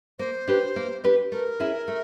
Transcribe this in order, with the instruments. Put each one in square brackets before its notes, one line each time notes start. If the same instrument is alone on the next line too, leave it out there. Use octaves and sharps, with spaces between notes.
[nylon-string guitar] A#3 [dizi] C5
[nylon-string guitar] D4 G4 B4
A#3
D4 G4 B4
[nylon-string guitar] A3 [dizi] A#4
[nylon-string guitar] C#4 E4 G#4
A3